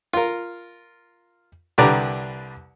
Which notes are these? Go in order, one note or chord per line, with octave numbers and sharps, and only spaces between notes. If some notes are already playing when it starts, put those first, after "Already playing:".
F4 A#4
C2 D3 G4 B4 D5 A#5